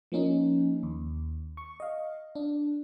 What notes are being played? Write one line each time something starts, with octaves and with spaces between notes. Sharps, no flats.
F3 A#3 C#4 D#4
D#2
C#6
D#5 F5
D4